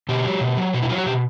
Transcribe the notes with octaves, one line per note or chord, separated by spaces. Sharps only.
B2 G4
F#3
B2
F#3
B2 F#4
E4
F#3 F4
F#4
B2 G4